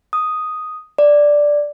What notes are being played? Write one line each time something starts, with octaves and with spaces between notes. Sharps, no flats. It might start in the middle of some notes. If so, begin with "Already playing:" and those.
D#6
D5